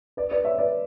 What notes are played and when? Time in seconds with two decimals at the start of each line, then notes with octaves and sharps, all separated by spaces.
0.17 B4 D5
0.31 B4 D5
0.45 C#5 E5
0.58 B4 D5